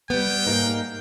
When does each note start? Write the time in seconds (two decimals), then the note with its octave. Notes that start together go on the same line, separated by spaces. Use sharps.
0.10 G3 B3 G5
0.47 G#2 A#3 D#4